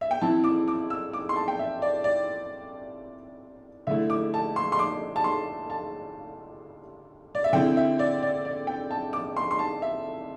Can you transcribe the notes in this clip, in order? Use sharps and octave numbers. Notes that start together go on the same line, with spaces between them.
E5
G5
E3 C4 E4 A5
D6
D6
E6
D6
C6
A5
G5
E5
D5
D5
D3 A3 E4 E5
D6
A5
C6
C6
D6
A5
C6
A5
D5
E5
D3 C4 E4 G5
E5
D5
D5
D5
G5
A5
D6
C6
C6
A5
E5